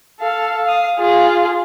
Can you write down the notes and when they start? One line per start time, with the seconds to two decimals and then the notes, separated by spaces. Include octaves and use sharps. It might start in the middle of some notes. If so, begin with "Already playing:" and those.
0.20 A4 F5
0.64 F5 D#6
0.99 F4 G#4